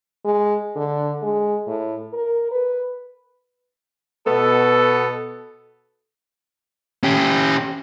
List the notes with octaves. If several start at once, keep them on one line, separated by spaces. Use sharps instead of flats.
G#3
D3
G#3
A2
A#4
B4
B2 B3 A4
C#4 G4